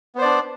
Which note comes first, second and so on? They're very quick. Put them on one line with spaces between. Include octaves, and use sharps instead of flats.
B3 C5 D5 D4